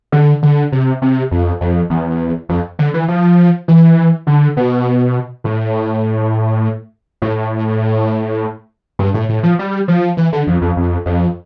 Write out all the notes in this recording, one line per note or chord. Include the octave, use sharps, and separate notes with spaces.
D3
D3
C3
C3
F2
F2
E2
F2
D3
E3
F3
E3
D3
B2
A2
A2
G2
A2
A2
F3
G3
F3
E3
D3
F2
F2
F2
F2